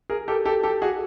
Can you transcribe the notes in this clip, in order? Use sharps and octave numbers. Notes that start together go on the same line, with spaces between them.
G#4 A#4
G4 A4
G4 A4
G4 A4
F#4 G#4